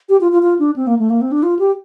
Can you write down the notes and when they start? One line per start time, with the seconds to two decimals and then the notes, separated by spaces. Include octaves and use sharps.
0.09 G4
0.21 F4
0.32 F4
0.42 F4
0.59 D4
0.76 C4
0.87 A#3
0.99 A3
1.10 A#3
1.21 C4
1.32 D4
1.43 F4
1.59 G4